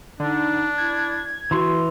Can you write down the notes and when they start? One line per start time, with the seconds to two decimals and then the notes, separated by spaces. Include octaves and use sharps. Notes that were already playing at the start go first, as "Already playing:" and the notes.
0.20 D3 D4 D#4
0.78 E4 G#6
1.51 E3 F#4 C6